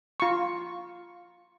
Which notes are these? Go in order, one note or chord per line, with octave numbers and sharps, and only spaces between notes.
F4 C#6